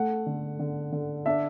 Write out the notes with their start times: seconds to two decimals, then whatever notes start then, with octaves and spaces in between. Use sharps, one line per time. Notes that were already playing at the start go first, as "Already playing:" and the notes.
Already playing: A3 F#5
0.26 D3
0.59 D3
0.92 D3
1.26 D4 E5